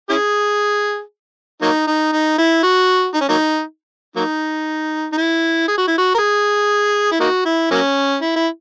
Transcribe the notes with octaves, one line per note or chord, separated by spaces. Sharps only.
C#4 E4 G#4
F#3 A#3 D#4
D#4
D#4
E4
F#4
D#4
C#4
F#3 A#3 D#4
F#3 A#3 D#4
D#4
E4
G#4
F#4
E4
F#4
A#4
G#4
E4
A#3 D#4 F#4
E4
F#3 A#3 C#4
E4
E4